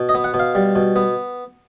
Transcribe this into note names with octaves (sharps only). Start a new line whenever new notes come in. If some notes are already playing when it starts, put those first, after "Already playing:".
Already playing: B2
D#5
B3
F#5
B2
F5
G3
B2
B3